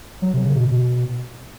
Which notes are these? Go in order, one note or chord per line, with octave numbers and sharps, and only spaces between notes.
F#3
C3
C#3
B2
B2